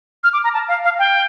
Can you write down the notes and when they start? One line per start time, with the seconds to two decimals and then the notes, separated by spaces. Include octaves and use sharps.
0.24 F6
0.33 D6
0.44 A#5
0.54 A5
0.68 F5
0.84 F5
0.99 G5